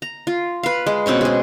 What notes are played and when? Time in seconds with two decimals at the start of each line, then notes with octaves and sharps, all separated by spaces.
0.02 A#5
0.27 F4
0.63 B4 F5
0.86 G#3
1.06 B2 C4 C#4 C#6
1.21 G#3 G#4